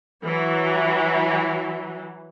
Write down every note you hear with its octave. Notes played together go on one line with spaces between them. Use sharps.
E3 F#3